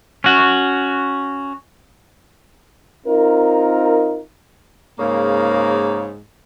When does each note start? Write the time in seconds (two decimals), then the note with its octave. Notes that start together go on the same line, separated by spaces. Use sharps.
0.24 C#4 F#4
3.07 C4 D#4 F4 A#4
4.99 G#2 C#3 A#3